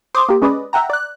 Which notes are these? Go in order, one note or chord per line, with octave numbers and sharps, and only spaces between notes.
C5 C6 D6 D#6
A#3 G4
G#3 C#4 B4 D5 D#5
E5 F#5 G5 A#5
D5 F#6